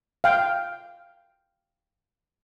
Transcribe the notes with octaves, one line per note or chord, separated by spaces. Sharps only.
F5 G5